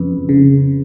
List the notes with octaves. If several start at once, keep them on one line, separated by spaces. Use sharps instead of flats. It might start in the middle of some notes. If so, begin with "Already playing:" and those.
Already playing: F2 C#3 B4
C#3